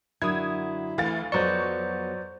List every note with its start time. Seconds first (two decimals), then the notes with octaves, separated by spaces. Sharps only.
0.22 F#2 D3 F#3 E4 D#6 G#6
0.98 D2 E3 A4 F5 A6
1.32 F2 F#3 B3 C5 D5 C#6 C#7